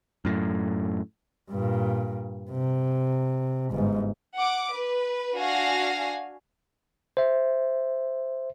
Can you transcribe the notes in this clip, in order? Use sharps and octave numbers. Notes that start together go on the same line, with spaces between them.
F#2 A2
G2 A#2
C3
G1 G#2
F#5 D6
B4
D4 F#4 F5 G#5 A#6 C7
C5 E5